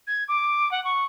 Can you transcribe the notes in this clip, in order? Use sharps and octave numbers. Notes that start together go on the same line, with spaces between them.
G#6
D6
F#5
C#6